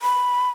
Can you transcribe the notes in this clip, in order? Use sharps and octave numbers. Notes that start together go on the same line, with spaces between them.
B5